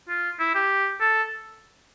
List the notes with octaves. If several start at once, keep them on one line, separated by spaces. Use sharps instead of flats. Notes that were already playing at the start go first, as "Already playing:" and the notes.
F4
E4
G4
A4